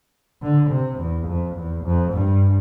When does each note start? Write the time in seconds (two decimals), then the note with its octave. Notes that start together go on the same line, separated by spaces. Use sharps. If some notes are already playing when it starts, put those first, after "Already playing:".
0.42 D3
0.70 C3
0.98 E2
1.26 F2
1.55 E2
1.84 F2
2.12 G2